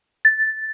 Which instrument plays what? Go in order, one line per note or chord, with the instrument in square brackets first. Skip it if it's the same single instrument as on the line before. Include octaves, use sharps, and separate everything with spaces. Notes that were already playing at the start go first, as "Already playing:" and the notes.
[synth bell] A6